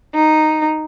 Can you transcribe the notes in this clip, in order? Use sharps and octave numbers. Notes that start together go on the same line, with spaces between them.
D#4